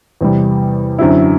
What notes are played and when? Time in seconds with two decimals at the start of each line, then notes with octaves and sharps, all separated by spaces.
0.21 E2 C3 G3
0.99 F#2 D3 F#3 C4 E4